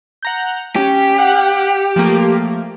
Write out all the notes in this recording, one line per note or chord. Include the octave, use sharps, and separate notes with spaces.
F#5 A#5 G6
C#4 G4
F5 F#5 F#6
F3 A3 A#3